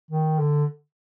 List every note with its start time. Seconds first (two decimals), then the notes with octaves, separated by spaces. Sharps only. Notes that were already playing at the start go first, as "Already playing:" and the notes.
0.11 D#3
0.39 D3